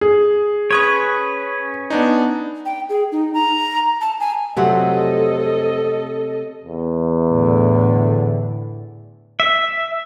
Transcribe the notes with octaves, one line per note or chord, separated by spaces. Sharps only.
G#4
C#4 B4 C#5 C#6 D#6 G#6
B3 D4 D#4
G5
G#4
D#4
A#5
A5
G#5
F2 C3 F#3 A3 C4 A4 D#5 F#5
E2
A2 D3
E5